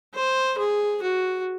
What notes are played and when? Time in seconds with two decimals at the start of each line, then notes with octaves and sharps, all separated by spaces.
0.14 C5
0.58 G#4
1.03 F#4